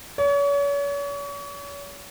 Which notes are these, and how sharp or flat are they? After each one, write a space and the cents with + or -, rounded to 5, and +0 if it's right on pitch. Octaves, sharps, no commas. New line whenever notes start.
C#5 +40